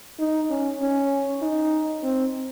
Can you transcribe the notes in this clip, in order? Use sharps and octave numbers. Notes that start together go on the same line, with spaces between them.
D#4
C#4
C#4
D#4
C4